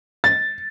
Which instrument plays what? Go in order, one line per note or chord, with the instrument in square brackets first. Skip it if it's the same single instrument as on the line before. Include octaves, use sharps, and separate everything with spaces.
[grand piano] A6